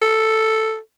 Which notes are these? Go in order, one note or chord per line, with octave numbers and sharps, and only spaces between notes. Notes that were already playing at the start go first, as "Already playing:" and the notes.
A4